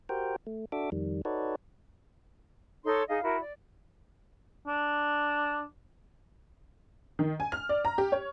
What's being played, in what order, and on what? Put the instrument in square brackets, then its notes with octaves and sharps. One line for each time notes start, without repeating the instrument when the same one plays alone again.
[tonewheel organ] F#4 G4 A#4 C5 G5
A3
D4 F#4 A4 E5 D6
F2 D#3 G3
D#4 F#4 A4 B4 C#5 D5
[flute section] D#4 A4 C#5 C6
D#4 G#4 D#5 F5
E4 F#4 A#4
D5
[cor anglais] D4
[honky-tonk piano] D#3
G#5
F6
D5
A#5
G4
C#5